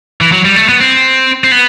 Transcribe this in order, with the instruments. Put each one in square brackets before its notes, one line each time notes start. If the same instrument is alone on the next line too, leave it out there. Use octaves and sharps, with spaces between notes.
[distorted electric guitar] E3
F#3
G3
A3
B3
C4
C4
B3